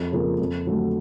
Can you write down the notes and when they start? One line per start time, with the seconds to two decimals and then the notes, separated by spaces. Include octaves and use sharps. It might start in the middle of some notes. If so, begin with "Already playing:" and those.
Already playing: F2
0.12 C#3 F3 A#3
0.40 F2
0.66 D3 F#3 A3